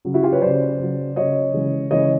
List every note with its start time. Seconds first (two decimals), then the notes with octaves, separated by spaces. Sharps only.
0.05 C#3 F#3
0.14 E4 F#4
0.23 F4 G4
0.32 B4 C#5
0.42 C#3 F#3 C5 D5
0.79 C#3 F#3
1.16 C#3 F#3 C#5 D#5
1.54 C#3 E3 G#3
1.91 C#3 E3 G#3 C#5 D#5